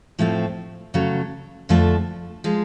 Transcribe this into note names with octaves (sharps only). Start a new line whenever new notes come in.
A2 F3 A3 C4
C#3 F#3 A3
F2 D3 F3 A3
F3 G#3